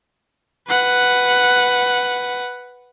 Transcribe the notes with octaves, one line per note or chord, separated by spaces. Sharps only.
B4 F#5